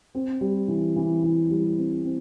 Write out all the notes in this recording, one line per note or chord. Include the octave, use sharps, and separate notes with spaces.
C4
G3
E3
E3
E3
G3
C4
C4